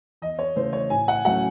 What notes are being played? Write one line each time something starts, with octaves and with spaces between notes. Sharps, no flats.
E2 D#5
C#5
C#3 E3 A3 C5
C#5
A2 G#5
F#5
F#3 A3 C#4 F#5